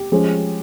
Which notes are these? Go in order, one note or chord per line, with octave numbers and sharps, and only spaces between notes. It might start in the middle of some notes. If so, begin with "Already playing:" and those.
Already playing: G4
F3 G#3 C#4